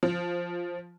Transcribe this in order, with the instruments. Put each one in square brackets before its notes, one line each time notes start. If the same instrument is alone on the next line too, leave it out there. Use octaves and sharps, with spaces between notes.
[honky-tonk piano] F3